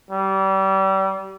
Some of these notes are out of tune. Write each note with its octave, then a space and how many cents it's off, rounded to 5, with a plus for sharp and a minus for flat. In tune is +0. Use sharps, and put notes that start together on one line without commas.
G3 -30